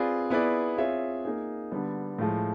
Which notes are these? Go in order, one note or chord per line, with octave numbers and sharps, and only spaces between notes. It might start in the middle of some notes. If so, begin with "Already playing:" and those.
Already playing: C4 F4 G#4 B4 D5
B3 E4 G#4 B4 D5
C4 F4 G#4 C#5 E5
A#3 D#4 G#4
D3 G3 B3
A2 F3 G#3